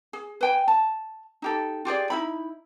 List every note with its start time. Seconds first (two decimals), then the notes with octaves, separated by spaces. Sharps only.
0.13 G#4
0.41 B4 G5 G#5
0.68 A5
1.42 D#4 G4 A4
1.85 F4 G4 G#4 D5
2.10 D#4 E4 B5